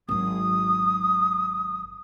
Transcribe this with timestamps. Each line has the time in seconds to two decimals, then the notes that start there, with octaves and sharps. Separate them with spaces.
0.09 G#1 F#3 D#6